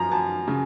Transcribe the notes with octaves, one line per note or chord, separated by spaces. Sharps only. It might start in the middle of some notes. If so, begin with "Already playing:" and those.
Already playing: F#2 F3 A#5
F#2 A5
C#3